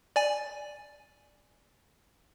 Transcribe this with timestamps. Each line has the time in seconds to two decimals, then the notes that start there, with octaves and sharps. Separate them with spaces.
0.16 D5 G#5